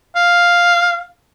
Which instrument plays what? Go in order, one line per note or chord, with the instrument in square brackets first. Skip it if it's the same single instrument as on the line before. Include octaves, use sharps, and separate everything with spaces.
[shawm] F5